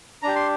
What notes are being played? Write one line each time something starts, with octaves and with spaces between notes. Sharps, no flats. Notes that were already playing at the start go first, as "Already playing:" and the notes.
D4 G4 A#5
C6